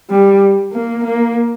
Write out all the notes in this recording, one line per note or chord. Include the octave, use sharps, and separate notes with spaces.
G3
A#3
A#3